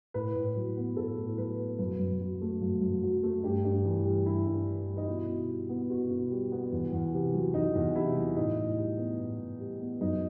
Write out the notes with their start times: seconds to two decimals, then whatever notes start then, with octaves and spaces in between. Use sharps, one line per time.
0.14 A2 B4
0.35 A2
0.56 F#3
0.77 B3
0.97 A2 A4
1.17 A2
1.37 F#3 B4
1.59 B3
1.79 F#2 B4
1.99 F#2
2.21 F#3
2.41 A3
2.62 F#2
2.81 F#2
3.03 F#3
3.23 A3
3.43 G2 G4
3.65 G2
3.85 E3
4.05 G3
4.26 G2 E4
4.46 G2
4.67 E3
4.87 G3
4.97 D#4
5.07 B2 E4
5.28 B2
5.49 G3
5.69 B3
5.89 B2 F#4
6.10 B2
6.31 G3
6.52 B3
6.72 E2
6.92 E2
7.13 C3
7.34 F#3
7.54 E2 D#4
7.75 E2
7.95 C3 E4
8.16 F#3
8.37 A2 D#4
8.57 A2
8.78 G3
8.98 B3
9.19 A2
9.39 A2
9.60 G3
9.81 B3
10.01 F#2 D#4